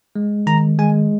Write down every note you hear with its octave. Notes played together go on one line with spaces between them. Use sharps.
G#3
D#3 A#5
G#3 G#5